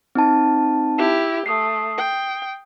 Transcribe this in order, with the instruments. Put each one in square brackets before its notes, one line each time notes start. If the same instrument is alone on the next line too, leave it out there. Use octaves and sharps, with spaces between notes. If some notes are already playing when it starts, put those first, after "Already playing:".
[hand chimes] C4 D#4 A5
[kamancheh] E4 G4
[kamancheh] A3 [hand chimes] D#6 C7
[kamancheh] G5